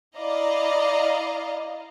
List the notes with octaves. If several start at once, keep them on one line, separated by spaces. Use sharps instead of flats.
E4 D5 D#5 F5 A#5